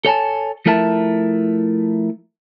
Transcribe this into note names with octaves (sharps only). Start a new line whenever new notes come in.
A4 C#5 G#5 A5
F3 A3 E4 A#4 E5 A5